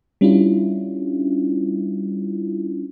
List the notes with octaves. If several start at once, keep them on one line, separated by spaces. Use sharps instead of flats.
G3 C#4 D4 E4 F4